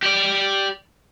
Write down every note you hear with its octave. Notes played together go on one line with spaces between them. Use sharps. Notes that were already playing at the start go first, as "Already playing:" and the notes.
G4 D5